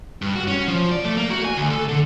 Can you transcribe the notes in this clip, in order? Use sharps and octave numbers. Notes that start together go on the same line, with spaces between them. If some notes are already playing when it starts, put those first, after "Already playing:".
G2
F#4
C#4
F3
D5
A3
A#3
F#4
G#5
D2
A4
D3